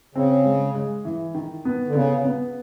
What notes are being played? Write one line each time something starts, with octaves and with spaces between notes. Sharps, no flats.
C#3 C4
G#3
G#3
E3
D#3
B3
D3
C#3 B3
B3